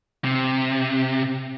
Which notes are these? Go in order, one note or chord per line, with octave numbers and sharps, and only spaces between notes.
C3